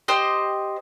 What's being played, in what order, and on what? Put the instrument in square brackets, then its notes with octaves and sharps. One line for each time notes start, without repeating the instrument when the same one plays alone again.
[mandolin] G4 C5 D#5